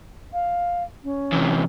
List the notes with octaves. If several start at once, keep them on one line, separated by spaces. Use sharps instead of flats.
F5
C#4
E2 C3